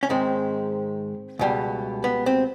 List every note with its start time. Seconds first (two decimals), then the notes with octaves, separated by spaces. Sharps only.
0.03 C#4
0.09 G#2 D#3 G#3 C4
1.39 C#2 B2 G3
2.04 B3
2.26 C4